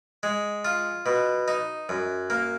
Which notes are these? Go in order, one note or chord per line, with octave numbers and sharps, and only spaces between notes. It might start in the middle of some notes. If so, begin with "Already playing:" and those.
G#3
F4
B2
D#4
F#2
A#3